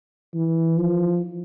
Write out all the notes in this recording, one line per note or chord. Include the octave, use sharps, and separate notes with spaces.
E3
F3